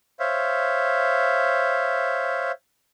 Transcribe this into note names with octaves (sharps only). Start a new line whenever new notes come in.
C5 C#5 E5 F5